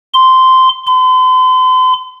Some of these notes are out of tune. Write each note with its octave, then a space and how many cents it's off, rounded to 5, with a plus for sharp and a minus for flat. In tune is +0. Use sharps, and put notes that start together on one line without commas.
C6 -10
C6 -40